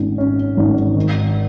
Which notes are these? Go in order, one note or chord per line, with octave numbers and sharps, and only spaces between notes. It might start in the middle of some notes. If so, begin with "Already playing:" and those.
Already playing: G#1 C#4
C#4
G#1
D#3